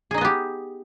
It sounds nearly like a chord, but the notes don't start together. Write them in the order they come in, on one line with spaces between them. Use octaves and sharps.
G#4 D#4 D#5 B3 G4